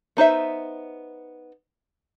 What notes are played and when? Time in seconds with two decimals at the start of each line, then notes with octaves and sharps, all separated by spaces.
0.17 B3 D#4 C5 E5